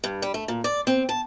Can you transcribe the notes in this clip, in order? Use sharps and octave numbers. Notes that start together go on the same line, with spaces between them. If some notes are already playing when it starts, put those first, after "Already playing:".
G2
G3
A3
A#2
D5
C4
A5